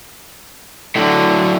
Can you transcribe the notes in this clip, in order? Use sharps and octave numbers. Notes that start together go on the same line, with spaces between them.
A2 D3 F#3